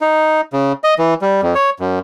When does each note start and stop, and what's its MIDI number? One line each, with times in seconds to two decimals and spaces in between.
0.01 0.41 63
0.53 0.73 49
0.84 0.94 75
0.99 1.14 52
1.22 1.41 55
1.43 1.54 41
1.55 1.70 73
1.80 1.99 42